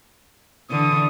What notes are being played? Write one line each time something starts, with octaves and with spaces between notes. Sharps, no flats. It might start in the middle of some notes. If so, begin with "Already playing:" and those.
D3 E3 D#6